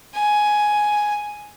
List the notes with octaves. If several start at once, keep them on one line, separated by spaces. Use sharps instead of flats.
G#5